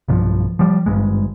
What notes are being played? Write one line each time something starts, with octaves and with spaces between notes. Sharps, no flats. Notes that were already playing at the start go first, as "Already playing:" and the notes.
B1 G2 F3
F3 G3
G#1 C#2 G2 G#3